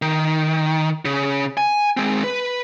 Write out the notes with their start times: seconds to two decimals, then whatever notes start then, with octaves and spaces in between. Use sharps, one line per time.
0.02 D#3
1.05 C#3
1.57 G#5
1.97 G#3 C4
2.24 B4